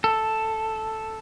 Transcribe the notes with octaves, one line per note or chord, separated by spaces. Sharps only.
A4